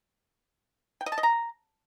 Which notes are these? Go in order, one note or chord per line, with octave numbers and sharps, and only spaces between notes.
G5
D#5
A5
D#5
A#5